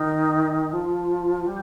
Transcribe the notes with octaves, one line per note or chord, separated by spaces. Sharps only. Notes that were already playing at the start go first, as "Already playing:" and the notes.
Already playing: D#3
F3
G3